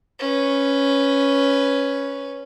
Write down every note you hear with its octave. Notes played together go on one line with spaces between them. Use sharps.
C#4 B4